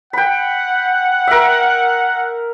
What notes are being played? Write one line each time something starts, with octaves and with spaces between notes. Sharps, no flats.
F#5 G5 B5
A#4 E5